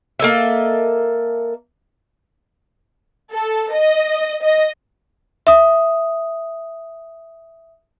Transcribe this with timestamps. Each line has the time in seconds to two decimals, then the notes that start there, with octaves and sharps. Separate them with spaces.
0.19 A#3 A4 D#5 E5
3.32 A4
3.73 D#5
4.43 D#5
5.47 E5 D#6